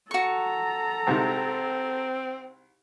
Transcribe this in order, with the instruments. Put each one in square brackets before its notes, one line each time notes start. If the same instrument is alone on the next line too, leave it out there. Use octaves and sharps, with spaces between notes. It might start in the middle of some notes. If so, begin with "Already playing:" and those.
[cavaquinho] F#4 C#6 [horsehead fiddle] A4 A#5
[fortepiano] C2 G#2 C3 [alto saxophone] C4